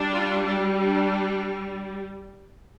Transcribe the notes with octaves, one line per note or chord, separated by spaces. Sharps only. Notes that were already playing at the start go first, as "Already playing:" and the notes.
Already playing: G3 D4
F4
D4 G4
D4